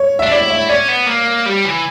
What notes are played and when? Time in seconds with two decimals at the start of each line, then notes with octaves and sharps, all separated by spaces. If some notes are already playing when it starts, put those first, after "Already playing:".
Already playing: C#5
0.19 D4 E5
0.31 E4 D5
0.50 E5
0.69 C#4 D5
0.89 B3
1.07 A#3
1.46 G3
1.65 E3